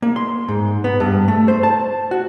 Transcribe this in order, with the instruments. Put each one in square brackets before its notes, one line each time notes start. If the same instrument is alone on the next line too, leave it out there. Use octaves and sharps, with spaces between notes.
[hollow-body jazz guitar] A#3
C6
G#2
B3
G2
A3
C5
A5
F#4